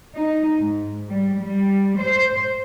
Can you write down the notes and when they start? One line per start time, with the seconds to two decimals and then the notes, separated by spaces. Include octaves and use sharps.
0.14 D#4
0.58 G#2
1.09 G3
1.41 G3
1.99 C5